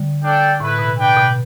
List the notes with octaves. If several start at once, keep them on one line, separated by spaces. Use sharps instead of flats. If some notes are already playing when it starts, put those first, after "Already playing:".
Already playing: D3 G3
D4 A4 D5 G5
A2 A3 E4 B4
B2
D4 B4 G5
B2